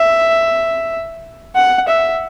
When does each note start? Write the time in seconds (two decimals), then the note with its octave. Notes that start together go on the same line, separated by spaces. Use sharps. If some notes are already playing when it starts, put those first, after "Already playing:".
Already playing: E5
1.56 F#5
1.88 E5